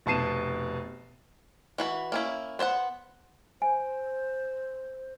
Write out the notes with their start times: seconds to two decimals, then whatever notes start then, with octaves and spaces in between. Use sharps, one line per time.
0.06 F1 B2 A5 C7 D#7 E7
1.78 E3 F#4 B4
2.12 A#3 C#4 E4
2.59 B3 C5 D#5 F#5
3.62 C5 G#5